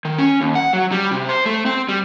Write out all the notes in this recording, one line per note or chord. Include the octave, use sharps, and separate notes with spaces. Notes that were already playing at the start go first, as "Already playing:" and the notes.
D#3
C#4
D#2
F#5
F#3
G3
C3
C5
A3
C4
G3